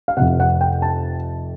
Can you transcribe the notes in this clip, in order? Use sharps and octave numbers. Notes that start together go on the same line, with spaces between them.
F5
F1 F2 C3 F#5
F#5
G5
A5